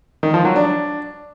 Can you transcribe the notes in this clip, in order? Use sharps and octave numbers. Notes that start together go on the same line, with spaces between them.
D#3
F3
F#3
D4